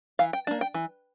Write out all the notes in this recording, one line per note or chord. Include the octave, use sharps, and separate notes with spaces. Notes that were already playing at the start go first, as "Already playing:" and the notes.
E3 F5
G5
A#3 D4 A5
G5
E3